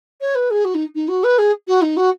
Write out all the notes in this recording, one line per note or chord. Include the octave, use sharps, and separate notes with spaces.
C#5
B4
G#4
F#4
D#4
D#4
F#4
B4
G#4
F#4
D#4
F#4